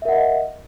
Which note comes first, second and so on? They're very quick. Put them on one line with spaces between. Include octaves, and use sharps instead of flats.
E5 A#4 F#5 D#5